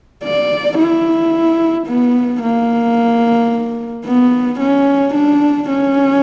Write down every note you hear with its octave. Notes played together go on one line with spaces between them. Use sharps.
D5
E4
B3
A#3
B3
C#4
D4
C#4